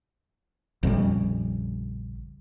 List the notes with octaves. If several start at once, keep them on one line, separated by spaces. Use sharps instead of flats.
A#1 F2 C#3 G3